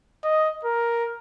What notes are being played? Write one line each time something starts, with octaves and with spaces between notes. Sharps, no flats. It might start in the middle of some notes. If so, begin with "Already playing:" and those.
D#5
A#4